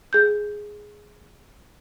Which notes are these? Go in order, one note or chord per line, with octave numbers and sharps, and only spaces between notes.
G#4 G6